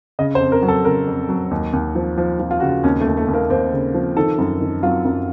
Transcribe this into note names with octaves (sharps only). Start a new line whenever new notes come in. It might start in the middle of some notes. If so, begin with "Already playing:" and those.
C#3 D#5
C5
F2
A#4
F#3
A4
C#3 A#4
F2
F#3
D#2
D#2
F3
F3
F3
F4
C#3 F#4
F4
D#2 C#4
A3
D#2
A3
D#2
A#3
D#2 C4
C#3
F3
D#3 A4
F#2
D#3
F#3 F4
F#2